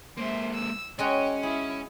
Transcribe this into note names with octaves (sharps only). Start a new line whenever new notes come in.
G#3 A#3 C5 E5
E6
G#3 C#4 F#4 C#5 G5
E4 G#4